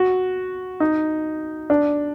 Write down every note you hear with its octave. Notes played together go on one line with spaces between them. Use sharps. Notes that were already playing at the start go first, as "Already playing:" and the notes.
Already playing: F#4
D#4
D4